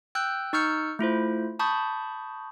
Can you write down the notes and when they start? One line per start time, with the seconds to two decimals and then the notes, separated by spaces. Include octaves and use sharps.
0.15 G5 E6 F#6 G6
0.53 D#4 C#6 E6 F6 G6 C#7
0.99 A3 E4 F4 C5
1.59 A5 B5 C#6 D#6 G6